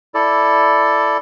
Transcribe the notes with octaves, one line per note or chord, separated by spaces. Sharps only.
E4 A4 D5